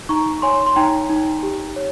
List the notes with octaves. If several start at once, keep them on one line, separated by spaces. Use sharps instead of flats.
D#4 A#5 C#6
C#5 G#5 C6
C6
D#4 G5 A#5
D#4
G4
C#5